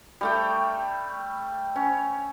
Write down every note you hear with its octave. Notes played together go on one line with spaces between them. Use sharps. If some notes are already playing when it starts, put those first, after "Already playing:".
G3 A3 G5
C#4